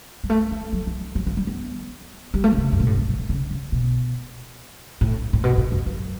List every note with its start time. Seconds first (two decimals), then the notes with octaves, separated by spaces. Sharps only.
0.24 G3
0.30 A3
0.52 A3
0.73 F#3
0.87 E3
1.15 F#3
1.27 E3
1.37 G3
1.47 B3
2.34 G3
2.44 A3
2.53 D3
2.58 C#3
2.72 F#2
2.80 B2
2.86 A2
2.97 B2
3.08 F#3
3.19 E3
3.29 C#3
3.51 C#3
3.72 B2
5.01 A2
5.33 A2
5.44 B2
5.58 A2
5.72 F#2
5.86 F#2